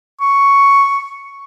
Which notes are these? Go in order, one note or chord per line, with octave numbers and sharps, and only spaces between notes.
C#6